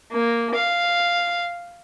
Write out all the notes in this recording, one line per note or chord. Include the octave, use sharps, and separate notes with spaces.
A#3
F5